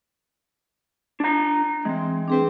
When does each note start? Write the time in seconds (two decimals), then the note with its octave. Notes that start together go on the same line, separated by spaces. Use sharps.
1.20 D4 A#5
1.85 E3 G#3 C4
2.28 C4 D4 G#4 B4